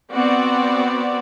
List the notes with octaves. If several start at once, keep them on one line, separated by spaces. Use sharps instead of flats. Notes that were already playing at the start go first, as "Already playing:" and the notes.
B3 C4 F#4 D5